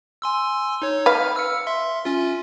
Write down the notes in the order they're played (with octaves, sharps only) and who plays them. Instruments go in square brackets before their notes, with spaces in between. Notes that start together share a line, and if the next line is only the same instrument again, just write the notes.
[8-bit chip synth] G#5 C6 E6
D#4 C#5
[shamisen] B4 F5 [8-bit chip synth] F6
[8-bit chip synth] E6 F6 C#7
E5 C6
C#4 F4